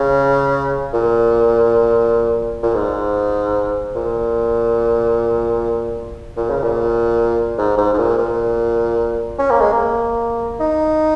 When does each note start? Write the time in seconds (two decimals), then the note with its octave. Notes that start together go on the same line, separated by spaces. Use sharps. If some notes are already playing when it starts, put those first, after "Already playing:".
Already playing: C#3
0.93 A#2
2.63 A#2
2.74 G#2
3.95 A#2
6.37 A#2
6.50 C#3
6.63 A#2
7.58 G#2
7.78 G#2
7.93 G#2
7.98 A#2
8.18 A#2
9.39 C#4
9.50 A#3
9.61 G#3
9.72 A#3
10.60 D#4